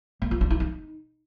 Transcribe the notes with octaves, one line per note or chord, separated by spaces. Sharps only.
A#3
F4
D4
E4
D#4